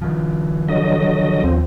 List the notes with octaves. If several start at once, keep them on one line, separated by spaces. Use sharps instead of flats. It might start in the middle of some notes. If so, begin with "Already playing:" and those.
D#3 F3
D3 F#3 D#5
D#2 F3 C4